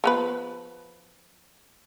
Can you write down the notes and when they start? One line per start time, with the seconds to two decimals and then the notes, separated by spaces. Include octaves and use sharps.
0.04 F3 B3 B4